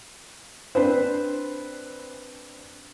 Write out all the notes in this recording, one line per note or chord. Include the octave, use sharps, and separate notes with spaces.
C4 D4 B4 C5